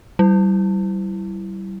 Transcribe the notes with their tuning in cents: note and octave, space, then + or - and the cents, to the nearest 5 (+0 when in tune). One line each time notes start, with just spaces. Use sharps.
G3 -30 E4 +10